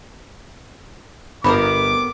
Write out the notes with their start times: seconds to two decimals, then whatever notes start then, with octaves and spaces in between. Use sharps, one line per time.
1.44 G1 B3 C4 A#4 B5 D6